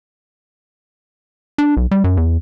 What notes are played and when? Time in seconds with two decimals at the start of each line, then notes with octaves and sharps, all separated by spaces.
1.58 D4
1.77 B1
1.91 G3
2.04 F#2
2.17 E2